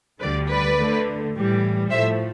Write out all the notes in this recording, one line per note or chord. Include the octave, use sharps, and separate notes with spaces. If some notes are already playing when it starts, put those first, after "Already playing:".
D2 D3 G3 B4 D5
B4 D5
D2 D3 A3
A2 E3 G3
A2 F3 A3 C5 E5